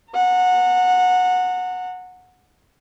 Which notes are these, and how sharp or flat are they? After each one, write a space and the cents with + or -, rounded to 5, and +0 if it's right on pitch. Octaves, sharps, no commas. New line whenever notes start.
F#5 -20 A#5 -40